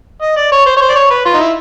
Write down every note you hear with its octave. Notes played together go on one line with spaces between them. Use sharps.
D#5
D5
C#5
C5
C#5
C5
D5
C#5
B4
F4
D#4
E4